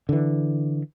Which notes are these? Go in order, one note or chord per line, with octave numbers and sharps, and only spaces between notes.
D3 E3